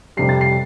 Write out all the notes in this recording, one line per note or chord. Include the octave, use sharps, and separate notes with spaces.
F2 C3 G3 C7
A6
C7